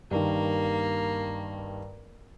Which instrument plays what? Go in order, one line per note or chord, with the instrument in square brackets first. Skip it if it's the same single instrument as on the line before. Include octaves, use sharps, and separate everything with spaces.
[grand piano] G2 D#3 [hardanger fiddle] A#3